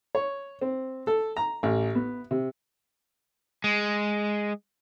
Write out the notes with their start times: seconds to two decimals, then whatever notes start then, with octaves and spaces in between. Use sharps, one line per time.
0.15 C#5
0.61 C4
1.07 A4
1.37 A#5
1.63 A1
1.95 B3
2.31 C3
3.64 G#3